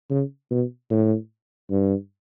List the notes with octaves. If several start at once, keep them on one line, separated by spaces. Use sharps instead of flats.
C#3
B2
A2
G2